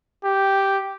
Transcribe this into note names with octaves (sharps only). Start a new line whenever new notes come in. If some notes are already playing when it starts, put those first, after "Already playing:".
G4